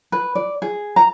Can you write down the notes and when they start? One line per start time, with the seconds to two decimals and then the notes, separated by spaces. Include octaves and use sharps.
0.12 B4
0.35 D5
0.62 G#4
0.96 A#5